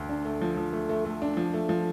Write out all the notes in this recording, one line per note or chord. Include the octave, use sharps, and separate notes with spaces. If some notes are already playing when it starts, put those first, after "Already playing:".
Already playing: D2
D4
A3
F3
F3
A3
A3
A3
D4
F3
A3
F3